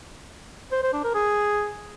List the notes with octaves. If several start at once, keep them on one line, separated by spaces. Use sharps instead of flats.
C5
C5
D4
A#4
G#4